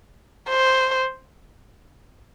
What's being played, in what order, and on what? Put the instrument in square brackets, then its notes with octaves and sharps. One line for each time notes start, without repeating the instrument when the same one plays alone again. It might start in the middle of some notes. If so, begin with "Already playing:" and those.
[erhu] C5